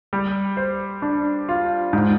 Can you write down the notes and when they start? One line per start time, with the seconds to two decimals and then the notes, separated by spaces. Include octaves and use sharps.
0.13 G3
0.57 C5
1.02 D4
1.49 F4
1.93 G#2